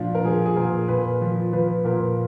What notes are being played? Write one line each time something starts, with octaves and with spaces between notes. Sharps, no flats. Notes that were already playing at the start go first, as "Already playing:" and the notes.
Already playing: A#2 F3 D4 F4
A#4
F3 G#4
G#4
A#2 A#4
A#2 B4
F3
F3 B4
A#2 A#4